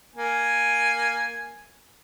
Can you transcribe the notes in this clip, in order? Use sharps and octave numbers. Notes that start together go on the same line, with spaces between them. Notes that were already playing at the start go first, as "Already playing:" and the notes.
A#3 G#5